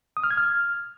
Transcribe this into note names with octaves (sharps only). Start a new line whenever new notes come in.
D#6
F6
G#6
F6